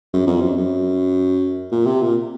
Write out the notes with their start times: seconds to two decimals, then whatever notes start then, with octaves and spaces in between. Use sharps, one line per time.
0.13 F#2
0.27 F2
0.42 F#2
0.56 F#2
1.72 A#2
1.86 C3
2.02 A#2